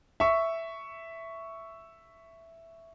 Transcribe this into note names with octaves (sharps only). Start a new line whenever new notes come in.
E5 C#6